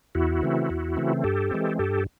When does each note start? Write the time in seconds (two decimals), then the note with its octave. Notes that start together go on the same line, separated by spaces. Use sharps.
0.15 E2 E4 F#4
0.42 C#3 E3 A3 C4
0.70 E2
0.97 C#3 E3 A3 C4
1.24 G2 G4 A4
1.51 E3 G#3 C4
1.79 G2 G4 A4